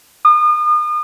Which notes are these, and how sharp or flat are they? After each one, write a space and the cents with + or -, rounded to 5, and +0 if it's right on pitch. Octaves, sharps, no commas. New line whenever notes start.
D#6 -40